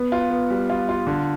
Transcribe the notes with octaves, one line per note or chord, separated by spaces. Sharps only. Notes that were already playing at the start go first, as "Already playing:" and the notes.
Already playing: B3
F4
B3
G3
F4
F4
D3